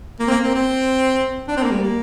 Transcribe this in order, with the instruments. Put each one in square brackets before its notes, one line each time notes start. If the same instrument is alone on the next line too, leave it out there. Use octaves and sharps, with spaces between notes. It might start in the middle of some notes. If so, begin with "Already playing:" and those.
[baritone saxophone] A#3
C4
A#3
C4
C4
D4
C4
A#3
G3
A#3